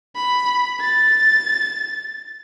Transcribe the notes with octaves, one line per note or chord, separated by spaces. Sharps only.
B5
A6